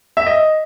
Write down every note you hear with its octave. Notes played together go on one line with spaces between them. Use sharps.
E5
D#5